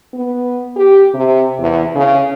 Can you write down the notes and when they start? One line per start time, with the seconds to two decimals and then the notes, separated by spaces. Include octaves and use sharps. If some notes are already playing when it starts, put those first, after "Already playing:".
0.14 B3
0.76 G4
1.14 C3
1.59 E2
1.95 C#3